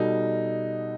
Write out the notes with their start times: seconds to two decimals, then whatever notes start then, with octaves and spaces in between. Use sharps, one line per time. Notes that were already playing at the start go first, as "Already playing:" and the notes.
Already playing: B2 G3 D#4 A4